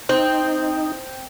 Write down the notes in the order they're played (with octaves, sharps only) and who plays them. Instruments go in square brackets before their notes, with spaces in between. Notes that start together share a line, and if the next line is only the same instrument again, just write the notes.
[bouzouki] C4 [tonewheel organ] D#4